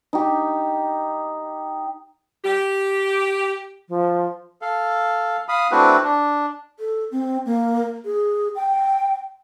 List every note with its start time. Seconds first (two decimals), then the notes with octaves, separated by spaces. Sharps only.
0.13 D#4 G4
2.45 G4
3.89 F3
4.62 A4 F5
5.49 F5 B5 D#6
5.71 A3 C4 D4 E4 F#4 B4
6.03 D4
6.79 A4
7.12 C4
7.46 A#3
8.05 G#4
8.55 G5